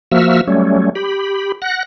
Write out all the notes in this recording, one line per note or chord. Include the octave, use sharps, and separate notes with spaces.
F3 A#3 F#4 E5 E6 F6
F#3 G3 A3 C#4
G4 B5
F#5 F#6 A#6